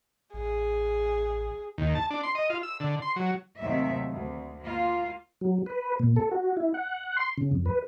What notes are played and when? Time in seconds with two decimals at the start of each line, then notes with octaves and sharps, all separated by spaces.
0.34 A1 G#4
1.78 D#2
1.95 A5
2.10 D4
2.23 C6
2.35 D#5
2.50 F4
2.63 E6
2.80 D3
3.02 C6
3.16 F#3
3.59 D#2 C3 D#3 F#3 A3 E5
4.10 D2
4.62 A#3 F4
5.41 F#3
5.66 B4
5.99 A#2
6.16 A4
6.31 F#4
6.57 E4
6.74 F#5
7.17 C6
7.37 C#3
7.52 F2
7.66 B4